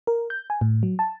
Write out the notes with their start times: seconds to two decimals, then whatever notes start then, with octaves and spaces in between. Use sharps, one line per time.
0.07 A#4
0.30 G6
0.50 G#5
0.61 A2
0.83 F#3
0.99 A5